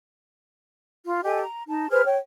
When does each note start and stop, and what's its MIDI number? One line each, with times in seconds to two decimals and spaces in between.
1.04 1.21 65
1.24 1.41 67
1.24 1.41 69
1.24 1.41 75
1.24 1.41 80
1.41 1.64 82
1.68 1.87 63
1.68 1.87 81
1.89 2.03 68
1.89 2.03 71
1.89 2.03 72
1.89 2.03 89
2.04 2.17 73
2.04 2.17 79